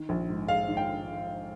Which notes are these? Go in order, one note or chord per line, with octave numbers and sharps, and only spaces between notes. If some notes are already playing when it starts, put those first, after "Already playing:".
Already playing: D#3
A#1
G#2
G#3 F5
D#3
G5